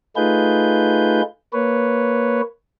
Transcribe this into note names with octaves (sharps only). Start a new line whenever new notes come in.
A3 D#4 F4 G#4 B4 G6
A#3 B4 C#5